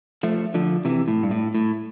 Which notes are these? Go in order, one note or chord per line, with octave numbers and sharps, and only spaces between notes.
F3 A3
D3 F3
C3 E3
A2
G2
A2
A2